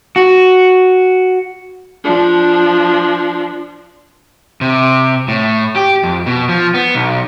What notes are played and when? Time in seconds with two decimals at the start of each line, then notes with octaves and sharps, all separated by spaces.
0.16 F#4
2.04 F3 D4
4.61 C3
5.28 A2
5.76 G4
6.03 F2
6.26 B2
6.49 F3
6.74 B3
6.95 B1